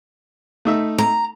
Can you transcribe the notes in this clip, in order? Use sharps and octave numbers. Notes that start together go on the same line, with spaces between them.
A3 D#4 E5
A#5